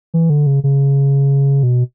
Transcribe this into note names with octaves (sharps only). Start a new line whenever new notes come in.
E3
D3
C#3
C#3
B2